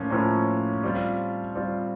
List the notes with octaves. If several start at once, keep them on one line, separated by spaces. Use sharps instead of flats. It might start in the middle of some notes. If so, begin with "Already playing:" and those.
Already playing: A2 F3 A#3 C#4
A2 F3 A#3 C#4
G3 C4 F4
G3 C4 F4